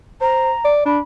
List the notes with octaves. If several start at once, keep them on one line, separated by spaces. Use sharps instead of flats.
C5 A#5
D5
D4 B5